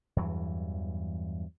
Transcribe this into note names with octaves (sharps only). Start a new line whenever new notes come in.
E2 G2 E3 F#3